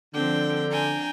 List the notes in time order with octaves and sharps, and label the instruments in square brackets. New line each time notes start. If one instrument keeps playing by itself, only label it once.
[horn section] D3 [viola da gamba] F3 C4 D4 [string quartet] G5
[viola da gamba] D4 [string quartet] G5 G#5 A#5